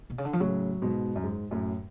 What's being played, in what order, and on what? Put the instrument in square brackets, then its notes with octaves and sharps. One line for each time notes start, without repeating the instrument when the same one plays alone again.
[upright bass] B2
C#3
D3
F3
[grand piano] A2 C#3 [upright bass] F#3
[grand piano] G#2 B2
F#2
G#2
F#2 A2